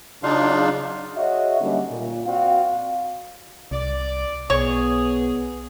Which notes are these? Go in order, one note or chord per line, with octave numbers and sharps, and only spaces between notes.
C#3 F#3 D4 D#4 F4 F5
F#4 G#4 C#5 D#5 E5
D3 F#3 G3 A#3 C#4 D#4
A#2
C4 F#4 D5 F5
C2 D5
B1 B3 G#4 C#5